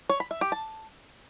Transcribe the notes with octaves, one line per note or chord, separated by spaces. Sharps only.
C#5
B5
E5
G4
A5